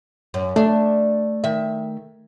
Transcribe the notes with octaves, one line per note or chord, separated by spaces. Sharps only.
F#2
A3 D4
D#3 E5